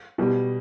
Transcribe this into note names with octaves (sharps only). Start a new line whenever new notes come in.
B2 G3